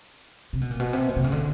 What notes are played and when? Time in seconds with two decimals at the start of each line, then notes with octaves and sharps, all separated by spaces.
0.53 C3
0.61 B2
0.71 A#2
0.80 B2
0.93 C3
1.09 B2
1.16 C3
1.24 C#3
1.32 D3